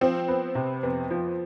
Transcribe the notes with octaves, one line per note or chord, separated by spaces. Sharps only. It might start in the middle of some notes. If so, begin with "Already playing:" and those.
F3 C4
B3
C3
F2 B3
F3